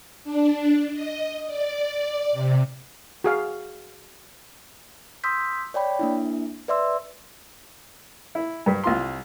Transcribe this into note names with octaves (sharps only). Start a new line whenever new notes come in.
D4
D#5
D5
C3
F#4 G#4 F5
C6 D#6 E6 G6 B6
C#5 D5 G5 B5
A#3 D4 E4
B4 D5 E5 C6 E6
E4
G2 B4
C2 F4 C6